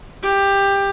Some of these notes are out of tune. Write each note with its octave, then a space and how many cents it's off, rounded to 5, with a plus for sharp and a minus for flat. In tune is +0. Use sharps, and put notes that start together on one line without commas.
G4 +15